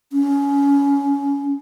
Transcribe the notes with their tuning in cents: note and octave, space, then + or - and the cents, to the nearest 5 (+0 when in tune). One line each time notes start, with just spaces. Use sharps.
C#4 +20